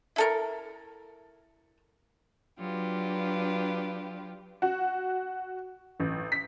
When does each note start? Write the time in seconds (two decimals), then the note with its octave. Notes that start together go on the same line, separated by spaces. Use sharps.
0.16 E4 A4 A#4
2.58 F#3 D4 F4 G4 B4
4.62 F#4
6.00 A1
6.32 B6